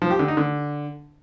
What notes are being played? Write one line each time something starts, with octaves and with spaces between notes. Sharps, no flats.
F3
G4
D3
D#4
D3